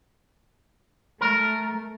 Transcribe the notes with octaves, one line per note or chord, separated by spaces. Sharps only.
A3 A#4